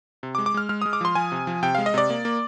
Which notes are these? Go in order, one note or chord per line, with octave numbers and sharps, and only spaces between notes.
C3
D6
G#3
D6
G#3 F6
G#3 F6
G#3 D#6
D6
F3 C6
F3 G#5
C3
F3
C3 G5
G#3 F5
D#5
C3 D5
A#3
A#3